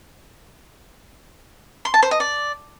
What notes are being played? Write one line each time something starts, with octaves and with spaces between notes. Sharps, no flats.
C6
A5
C5
D#5
D5